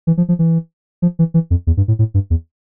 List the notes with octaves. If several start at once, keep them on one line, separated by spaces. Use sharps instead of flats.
E3
F3
F3
E3
F3
E3
E3
F2
E2
G2
A2
A2
G2
E2